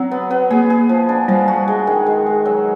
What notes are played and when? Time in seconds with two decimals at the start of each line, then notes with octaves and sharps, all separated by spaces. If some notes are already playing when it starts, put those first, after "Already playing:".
Already playing: F#3 C4
0.11 B3
0.30 B3
0.50 A#3 G#4
0.70 G#4
0.89 F3
1.09 D4
1.28 F3 G3
1.48 F#4
1.68 G#3
1.87 D#3
2.06 G#3
2.26 G#3
2.45 F#3